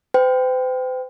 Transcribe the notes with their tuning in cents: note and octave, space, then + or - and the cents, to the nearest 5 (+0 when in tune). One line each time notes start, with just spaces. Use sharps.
C5 -45 G5 +0